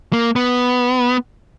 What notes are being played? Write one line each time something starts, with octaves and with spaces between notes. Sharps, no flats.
A#3
B3